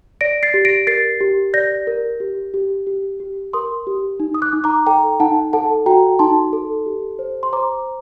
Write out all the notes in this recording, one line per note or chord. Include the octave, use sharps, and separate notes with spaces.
D5 A#6 D7
A6 C7
G4
A#6 D7
A#4 A6 C7
G4
D5 G6 A#6
A#4
G4
G4
G4
G4
A#4 C6 D#6
G4
D#4
D#6
D6 F#6
D#4
A#5 D6
A4 G5 A#5
D#4 F#5 A5
A4 F#5 A5
F#4 G5 A#5
D#4 A5 C6
A4
G4
C5
C6
C5 A#5 D6